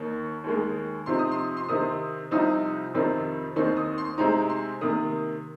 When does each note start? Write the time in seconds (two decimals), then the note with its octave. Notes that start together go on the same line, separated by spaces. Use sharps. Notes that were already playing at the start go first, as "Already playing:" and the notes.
Already playing: D#2 D#3 A#3 D#4
0.44 D#2 D#3 G#3
1.06 C3 F3 C4 D#4 C6
1.19 D#6
1.31 C6
1.43 D#6
1.57 C6
1.68 C3 D#3 C4 D#4 D#6
1.82 C6
2.31 C2 C3 F3 C4 D#4 D#6
2.94 F2 C3 D#3 C4 D#4
3.56 D#2 D#3 C4 D#4 C6
3.77 D#6
3.98 C6
4.18 C3 G#3 C4 D#4 A#5
4.49 C6
4.81 C3 D#3 A#3 D#6